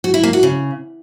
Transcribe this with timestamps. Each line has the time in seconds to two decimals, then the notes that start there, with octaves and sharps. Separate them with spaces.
0.04 F#4
0.14 E4
0.23 A#3
0.33 F#4
0.43 C#3